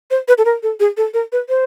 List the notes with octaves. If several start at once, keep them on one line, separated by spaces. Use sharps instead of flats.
C5
B4
A4
A#4
A4
G#4
A4
A#4
B4
C5